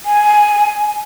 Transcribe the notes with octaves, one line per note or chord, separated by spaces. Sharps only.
G#5